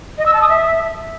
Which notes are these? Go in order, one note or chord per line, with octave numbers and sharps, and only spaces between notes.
D#5
E6
A5
D#6
E5